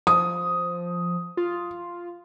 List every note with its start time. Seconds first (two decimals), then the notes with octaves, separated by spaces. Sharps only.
0.07 F3 D#6
1.37 F4